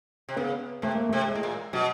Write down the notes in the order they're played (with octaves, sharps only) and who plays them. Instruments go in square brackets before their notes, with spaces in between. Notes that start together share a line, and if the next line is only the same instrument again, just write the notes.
[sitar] C3
[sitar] C#3 [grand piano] B3
[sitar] C3 [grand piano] A3
[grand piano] A#3
[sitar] C3 [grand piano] A3
[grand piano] G#3
[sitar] A2
A#2
[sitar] B2 [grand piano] F#3